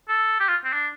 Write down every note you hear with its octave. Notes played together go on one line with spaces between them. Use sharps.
A4
G4
F4
C4
D4